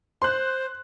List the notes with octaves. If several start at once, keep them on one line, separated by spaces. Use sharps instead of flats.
C5 C6 F#6